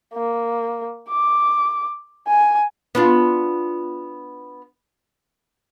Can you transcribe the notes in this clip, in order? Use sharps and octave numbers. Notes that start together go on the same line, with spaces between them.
A#3
D6
G#5
B3 D4 F4